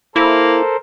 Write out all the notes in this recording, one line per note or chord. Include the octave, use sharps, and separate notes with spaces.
A#3 E4 A4 A#4 C5